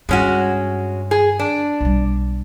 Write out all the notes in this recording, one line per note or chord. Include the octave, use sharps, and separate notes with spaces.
G2 G#3 C#4 F#4
G#4
D4
B1 G3